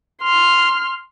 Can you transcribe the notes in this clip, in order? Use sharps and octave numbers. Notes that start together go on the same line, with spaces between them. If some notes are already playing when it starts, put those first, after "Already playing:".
C6 F6